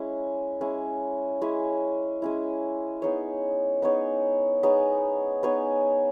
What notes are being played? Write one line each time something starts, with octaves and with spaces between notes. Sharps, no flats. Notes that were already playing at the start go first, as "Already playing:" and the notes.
Already playing: G#3 C#4 E4
G#3 C#4 E4
G#3 C#4 E4
G#3 C#4 E4
B3 D#4 G#4 C#5
B3 D#4 G#4 C#5
B3 D#4 G#4 C#5
B3 D#4 G#4 C#5